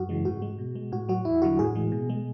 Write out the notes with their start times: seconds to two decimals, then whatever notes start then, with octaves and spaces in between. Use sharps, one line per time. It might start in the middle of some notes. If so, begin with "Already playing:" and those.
Already playing: F#2 F#4
0.09 C#3 E3 G#3
0.25 G#2 F#4
0.42 G#3
0.58 B2
0.75 G#3
0.92 A2 F#4
1.09 F#3 F#4
1.25 E2 E4
1.42 D3 F#3 F#4
1.59 A2 G#4
1.75 E3 G#3
1.92 B2
2.10 G#3